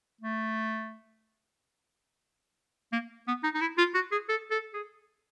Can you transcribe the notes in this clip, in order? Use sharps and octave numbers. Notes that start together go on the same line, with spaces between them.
A3
A#3
B3
D#4
D#4
E4
F4
F#4
G#4
A4
A4
G#4